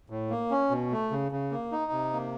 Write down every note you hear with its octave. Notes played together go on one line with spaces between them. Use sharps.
A2
A#3
C#4
B2
A3
C#3
C#3
A#3
D#4
C3
A#3